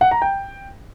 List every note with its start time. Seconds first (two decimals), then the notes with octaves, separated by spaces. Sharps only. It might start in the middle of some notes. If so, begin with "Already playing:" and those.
0.01 F#5
0.11 A#5
0.22 G5